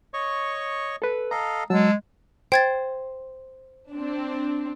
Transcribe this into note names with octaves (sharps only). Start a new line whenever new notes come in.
C#5 D#5 C#6
A4 B4
A4 D#5 F5 A#5
F#3 G#3 A5 E6
C5 G5 G#6 A6
C4 D4